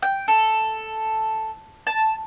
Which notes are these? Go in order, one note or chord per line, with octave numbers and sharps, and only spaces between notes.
G5
A4
A5